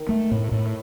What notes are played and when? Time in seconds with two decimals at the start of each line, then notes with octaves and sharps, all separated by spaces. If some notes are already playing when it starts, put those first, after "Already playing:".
Already playing: D#3
0.09 A3
0.31 A2
0.52 A2